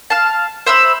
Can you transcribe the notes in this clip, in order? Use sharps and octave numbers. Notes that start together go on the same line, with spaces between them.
F5 A5
C5 E5 B5 E6